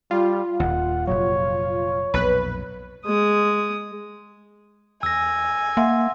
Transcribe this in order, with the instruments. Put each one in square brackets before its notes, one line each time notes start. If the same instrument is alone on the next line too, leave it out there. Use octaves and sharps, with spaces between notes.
[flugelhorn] G3 [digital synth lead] F4
[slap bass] D#1 D#2 [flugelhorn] F#5
[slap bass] F1 A#2 F#3 [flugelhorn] C#5
[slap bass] B1 F2 A#2 [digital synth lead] B4
[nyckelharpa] G#3 D#6
[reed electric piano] E2 [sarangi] G#5 [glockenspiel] E6 A#6
[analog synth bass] A#3 [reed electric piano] E5 F#5 C6